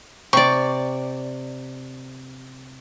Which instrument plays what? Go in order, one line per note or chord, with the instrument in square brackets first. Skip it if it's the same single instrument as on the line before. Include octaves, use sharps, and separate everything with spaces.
[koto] C3 D5 [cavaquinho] C#6